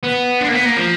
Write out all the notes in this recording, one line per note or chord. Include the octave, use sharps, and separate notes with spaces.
B3
D4
A#3
B3
A#3
F3